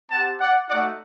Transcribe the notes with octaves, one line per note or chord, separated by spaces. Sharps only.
C4 G4 F#5 A5
D5 F#5
A3 D#4 F#4 D5 F#5